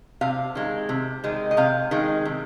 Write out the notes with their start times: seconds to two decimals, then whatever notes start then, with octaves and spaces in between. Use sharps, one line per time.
0.21 C3 F5
0.55 D#3 G#3
0.89 C3
1.24 D#3 G#3
1.51 D#5
1.57 C3 F5
1.91 D#3 G#3
2.25 C3